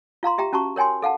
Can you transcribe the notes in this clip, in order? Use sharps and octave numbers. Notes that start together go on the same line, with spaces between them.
F4 F5 A#5 C6
G4 E5 G5 A#5
C#4 F#4 A5 A#5 C#6
A#4 C#5 G5 G#5 C6
A4 F5 F#5 A5